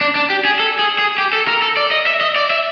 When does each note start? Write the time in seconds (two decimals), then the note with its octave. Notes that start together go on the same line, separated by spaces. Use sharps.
0.01 D4
0.15 D4
0.30 G4
0.45 G#4
0.60 A4
0.79 G#4
0.99 G#4
1.18 G4
1.33 A4
1.48 A#4
1.62 A4
1.77 D5
1.91 D#5
2.06 E5
2.21 D#5
2.36 D5
2.50 E5